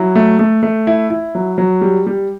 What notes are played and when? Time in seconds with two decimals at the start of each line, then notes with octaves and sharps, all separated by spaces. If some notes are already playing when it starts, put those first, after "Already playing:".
Already playing: F#3 E4
0.15 A3
0.39 A3
0.63 A3
0.87 E4
1.10 E4
1.35 F#3
1.58 F#3
1.81 G3
2.07 G3